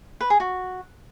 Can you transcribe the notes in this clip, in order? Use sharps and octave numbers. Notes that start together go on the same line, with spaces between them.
B4
G#4
F#4